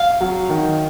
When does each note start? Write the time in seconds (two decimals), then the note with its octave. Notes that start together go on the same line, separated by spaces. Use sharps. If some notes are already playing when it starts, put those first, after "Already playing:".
Already playing: F5
0.21 F#3
0.49 D#3